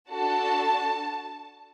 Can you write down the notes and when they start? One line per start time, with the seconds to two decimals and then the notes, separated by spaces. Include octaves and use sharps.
0.11 D4 F#4 A4 A5